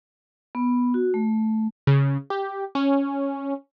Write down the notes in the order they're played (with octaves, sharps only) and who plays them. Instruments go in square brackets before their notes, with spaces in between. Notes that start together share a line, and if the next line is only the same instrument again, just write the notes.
[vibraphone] B3
F#4
A3
[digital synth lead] C#3
G4
C#4